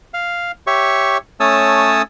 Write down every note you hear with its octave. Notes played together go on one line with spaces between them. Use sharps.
F5
G4 C#5 E5 C#6
A3 C#4 C#5 A5 D#6 E6